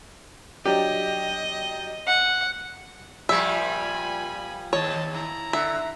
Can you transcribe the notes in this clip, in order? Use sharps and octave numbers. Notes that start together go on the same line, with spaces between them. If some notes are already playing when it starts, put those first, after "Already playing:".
F#3 D4 G4 D#5
F#5
A#2 F3 G3 E5 G#5 B5
D#2 C#5 D#5 A5
E4 A#5
D3 E5